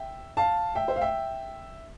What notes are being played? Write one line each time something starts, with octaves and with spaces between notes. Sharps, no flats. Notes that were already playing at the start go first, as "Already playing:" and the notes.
Already playing: E5 G5
F5 A5
E5 G5
C5 E5
F5
E5 G5